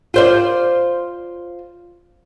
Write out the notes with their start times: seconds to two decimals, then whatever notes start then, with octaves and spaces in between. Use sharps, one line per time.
0.14 F4 C5 D5